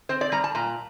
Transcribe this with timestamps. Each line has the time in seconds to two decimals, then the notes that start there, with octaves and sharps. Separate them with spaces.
0.09 C4 C5
0.21 D5
0.32 G3 A#5
0.44 A5
0.55 A#2 A#5